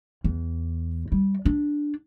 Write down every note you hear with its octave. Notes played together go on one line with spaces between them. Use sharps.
E2
G3
D4